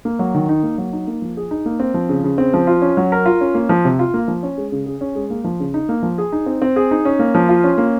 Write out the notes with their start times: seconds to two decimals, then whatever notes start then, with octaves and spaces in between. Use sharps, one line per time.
0.05 A#3
0.19 F#3
0.34 D#3
0.49 D#4
0.63 A#3
0.78 F#3
0.93 D#4
1.07 A#3
1.22 F3
1.37 G#4
1.51 D#4
1.66 A#3
1.80 C4
1.94 F3
2.09 C#3
2.24 C#3
2.38 C4
2.54 F3
2.67 F4
2.82 C#4
2.97 F#3
3.12 A#4
3.26 F4
3.41 C#4
3.55 A#3
3.69 F3
3.85 C3
3.99 F4
4.14 A#3
4.28 F3
4.43 C#4
4.58 G#3
4.72 C#3
4.86 G#4
5.01 C#4
5.15 G#3
5.30 A#3
5.44 F3
5.60 C#3
5.74 D#4
5.89 A#3
6.03 F3
6.18 G#4
6.32 D#4
6.46 C4
6.62 C4
6.76 G#4
6.91 D#4
7.05 C#4
7.19 A#3
7.35 F3
7.49 F4
7.64 C#4
7.78 A#3